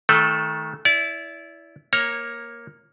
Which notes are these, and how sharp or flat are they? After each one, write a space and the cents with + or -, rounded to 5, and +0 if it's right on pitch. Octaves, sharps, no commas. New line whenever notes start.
D#3 +25 A3 -10 A4 -10
E4 +0 D5 -30
A#3 +5 C#5 -15 A#5 +0